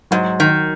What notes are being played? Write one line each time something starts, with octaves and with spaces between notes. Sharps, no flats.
G#2 F#3 F#4
D#3